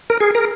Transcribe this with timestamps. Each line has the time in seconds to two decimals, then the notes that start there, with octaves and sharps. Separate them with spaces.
0.10 A#4
0.20 G#4
0.35 A#4